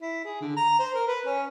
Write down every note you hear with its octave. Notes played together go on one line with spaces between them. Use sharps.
E4
G#4
D3
A#5
C5
A#4
B4
C#4